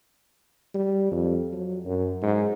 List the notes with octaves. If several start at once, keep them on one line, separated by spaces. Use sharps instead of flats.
G3
F2
F#3
F#2
G#2